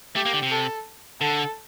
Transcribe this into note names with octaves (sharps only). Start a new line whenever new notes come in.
A3 G4
A#3
D3
C3
A4
D3 A4